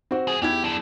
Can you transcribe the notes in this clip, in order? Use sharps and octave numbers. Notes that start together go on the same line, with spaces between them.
C4 F#4
F3 G#4
E2 E4 G4 G#6
F#2 D4